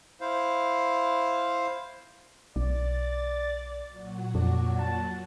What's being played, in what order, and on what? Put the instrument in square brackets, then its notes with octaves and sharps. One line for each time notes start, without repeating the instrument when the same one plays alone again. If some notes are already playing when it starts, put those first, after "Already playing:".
[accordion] E4 C5 F5
[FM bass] B1 [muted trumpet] D5 [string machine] A6
[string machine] A#2 F#3 F#4
[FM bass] F2 [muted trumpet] D4
[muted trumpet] A5